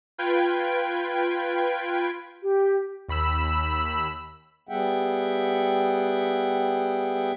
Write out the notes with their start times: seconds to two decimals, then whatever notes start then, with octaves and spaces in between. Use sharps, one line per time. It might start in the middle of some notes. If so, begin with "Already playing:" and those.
0.18 F4 B4 G5 G#6 D7
2.42 G4
3.09 D#2 B5 E6
4.69 G3 B3 G#4 E5 F#5 G5